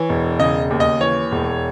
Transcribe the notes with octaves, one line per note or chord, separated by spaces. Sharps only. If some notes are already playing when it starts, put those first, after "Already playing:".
Already playing: E3 C#5
E1
C#3 D#5
D#2
D#5
E3 C#5
E1